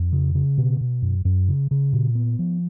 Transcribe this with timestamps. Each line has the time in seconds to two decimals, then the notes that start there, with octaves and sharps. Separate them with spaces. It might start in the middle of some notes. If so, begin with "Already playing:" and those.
Already playing: F2
0.12 C#3
0.35 C#3
0.58 B2
0.81 B2
1.02 F#2
1.25 F#2
1.49 C#3
1.71 C#3
1.93 A#2
2.15 B3
2.39 F3